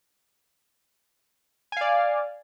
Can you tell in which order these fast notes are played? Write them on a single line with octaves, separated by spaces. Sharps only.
G#5 F5 D5